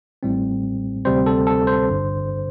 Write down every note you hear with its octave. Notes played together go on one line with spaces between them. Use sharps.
A1 A2 G3 C4
D2 C3 G3 C4 C5
A4
A4
C5
G1 G2 D3